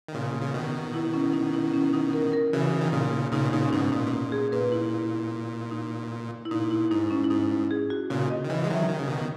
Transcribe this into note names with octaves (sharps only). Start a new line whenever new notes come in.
D#3
A#2 C#3
C#3
B2 D#3
E4
C#4
D#4
E4
C#4
D#4
A#4
A#4
C#3 E3 F#4
D#3
A#2 C#3 D#4
A#2 C#3 D#4
B2
A#2 C#3 D#4
C#4
G#2 B2 D#4
A#2 D#4
B2
A#2
G#4
A#2 B4
E4
D#4
E4
A#2 D#4
E4
G#2 D#4
C#4
E4
G#2 D#4
G#4
F#4
A#2 C#3 F#4
D#5
D#3
C#3 E3
G#3
D#3 F#3 E5
D#3
C#3
B2 D#3